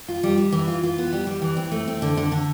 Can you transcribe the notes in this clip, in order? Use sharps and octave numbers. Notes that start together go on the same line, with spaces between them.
F4
G3
G3
E3
F4
F4
B3
G3
G3
E3
C4
A3
C4
D3
D3
D3